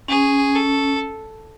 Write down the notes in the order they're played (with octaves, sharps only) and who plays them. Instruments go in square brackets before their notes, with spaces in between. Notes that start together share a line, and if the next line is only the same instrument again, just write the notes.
[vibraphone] C#4 [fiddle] G#4
[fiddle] A4